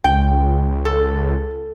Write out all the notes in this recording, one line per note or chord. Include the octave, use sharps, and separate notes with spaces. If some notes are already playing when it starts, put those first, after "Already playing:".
C#2 G5
A4